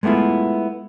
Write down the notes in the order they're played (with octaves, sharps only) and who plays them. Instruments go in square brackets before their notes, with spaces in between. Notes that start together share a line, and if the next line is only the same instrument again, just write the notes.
[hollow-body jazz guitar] G#3 A3 B3 E4 F4